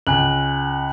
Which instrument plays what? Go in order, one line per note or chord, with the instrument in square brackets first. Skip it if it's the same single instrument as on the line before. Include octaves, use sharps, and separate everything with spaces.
[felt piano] C#2 [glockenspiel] G#5 F#6 F#7